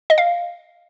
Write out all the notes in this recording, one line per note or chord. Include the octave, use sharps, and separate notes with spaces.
D#5
F5